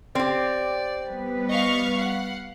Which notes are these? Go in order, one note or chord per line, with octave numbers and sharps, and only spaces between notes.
C4 G4 D5
G3 B3 B4
D#5 F5 C#6
F5 F#5